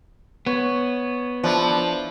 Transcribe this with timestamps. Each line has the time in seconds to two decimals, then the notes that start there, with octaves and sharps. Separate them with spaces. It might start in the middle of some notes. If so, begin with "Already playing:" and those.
0.46 B3 C#5
1.44 F3 D4 E4 A4